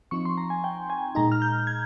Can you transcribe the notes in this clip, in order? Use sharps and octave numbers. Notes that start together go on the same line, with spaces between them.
F3 C4 D#4 C#6
C6
A#5
G#5
G5
G#5
A#2 G#3 D#4 A#5
F6
G6
G#6